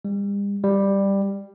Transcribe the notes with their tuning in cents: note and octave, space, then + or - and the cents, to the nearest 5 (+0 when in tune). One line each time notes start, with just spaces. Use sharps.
G3 +45
G3 +10